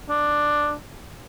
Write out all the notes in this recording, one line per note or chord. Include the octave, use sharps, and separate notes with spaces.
D4